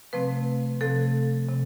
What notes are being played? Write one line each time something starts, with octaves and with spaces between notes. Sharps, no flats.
C3 F3 A3 C4 B4
C3 F3 A3 C4 A4
C3